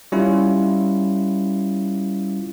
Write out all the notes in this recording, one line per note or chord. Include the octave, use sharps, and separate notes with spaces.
G3 C#4 E4 F4